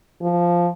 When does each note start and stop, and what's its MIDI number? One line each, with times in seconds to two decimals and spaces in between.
0.22 0.69 53